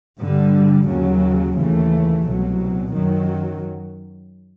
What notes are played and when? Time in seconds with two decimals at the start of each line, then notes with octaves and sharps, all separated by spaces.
0.19 G2 D3 G3
0.88 D#2 C#3 F#3
1.57 D#2 C#3 E3 A3
2.26 C2 B2 F#3
2.93 F#2 D#3 F#3